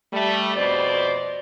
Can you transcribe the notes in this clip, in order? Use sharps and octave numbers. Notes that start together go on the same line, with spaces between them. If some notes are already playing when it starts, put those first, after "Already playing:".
G3 A3
F2 B2 C5 D5